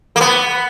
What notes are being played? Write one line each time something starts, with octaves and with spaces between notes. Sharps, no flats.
A#3
B3